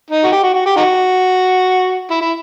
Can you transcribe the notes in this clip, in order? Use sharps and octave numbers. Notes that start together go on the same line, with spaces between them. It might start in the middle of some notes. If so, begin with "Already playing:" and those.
D#4
F#4
G4
F#4
F#4
G4
D#4 F#4
E4
E4